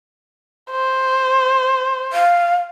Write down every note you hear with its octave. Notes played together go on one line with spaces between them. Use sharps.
C5
F5